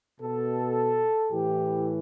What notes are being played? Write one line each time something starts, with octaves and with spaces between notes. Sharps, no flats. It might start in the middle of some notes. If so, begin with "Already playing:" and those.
B2 A4
A2 E3 G4